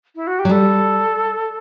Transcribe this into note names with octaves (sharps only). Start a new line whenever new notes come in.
E4
F#4
G4
F#3
G3 A4